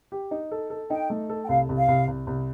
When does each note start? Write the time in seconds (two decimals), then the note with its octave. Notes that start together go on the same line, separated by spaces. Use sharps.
0.12 G4
0.31 D#4
0.52 A4
0.70 A4
0.90 D#4 G5
1.10 A3
1.30 A4
1.45 G5
1.49 C2 F5
1.69 C2
1.79 F5
1.88 C2
2.08 C2
2.27 C2